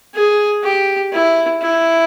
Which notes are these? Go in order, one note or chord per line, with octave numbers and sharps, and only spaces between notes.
G#4
G4
E4
E4